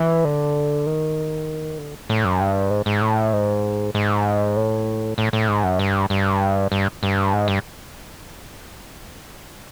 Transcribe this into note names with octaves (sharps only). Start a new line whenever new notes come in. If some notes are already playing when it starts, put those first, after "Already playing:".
Already playing: E3
D3
D#3
D3
A2
F#2
G2
G#2
G#2
A2
G#2
G#2
A2
A2
A2
G#2
F#2
G2
G2
G2
G2
G#2
G2